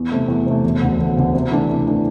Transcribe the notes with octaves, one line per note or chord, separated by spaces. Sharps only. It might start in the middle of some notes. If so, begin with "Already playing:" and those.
Already playing: E2
C3 A3
E2
C3 A3
E1
D2 D3
E1
D2 D3
C3
E3 A3 D4
C3
E3 A3 D4